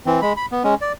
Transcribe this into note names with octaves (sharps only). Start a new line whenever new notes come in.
E3 C4
G#3 B5
B5
B3
G#3 C#4
D5